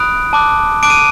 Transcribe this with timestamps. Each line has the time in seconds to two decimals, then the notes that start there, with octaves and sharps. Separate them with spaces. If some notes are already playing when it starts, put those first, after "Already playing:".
Already playing: B5 D#6 F#6 D7
0.33 A5 D6 F#6
0.83 A5 D6 F#6 D7
0.90 D#7